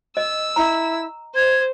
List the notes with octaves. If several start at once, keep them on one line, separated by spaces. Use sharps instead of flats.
D#5 E6
E4 A#5
C5 G#6